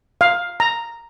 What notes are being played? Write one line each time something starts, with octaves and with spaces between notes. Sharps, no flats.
F5
A#5